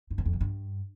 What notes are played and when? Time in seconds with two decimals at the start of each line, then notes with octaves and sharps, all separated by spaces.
0.11 G2
0.18 F#2
0.26 F2
0.33 C#3
0.41 G2